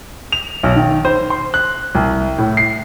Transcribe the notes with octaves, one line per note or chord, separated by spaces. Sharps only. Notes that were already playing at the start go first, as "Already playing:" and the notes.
F7
B1
D#3
C5
C6
F#6
C2
A2
C7